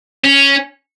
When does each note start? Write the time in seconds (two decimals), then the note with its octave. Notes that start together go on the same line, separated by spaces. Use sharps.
0.24 C#4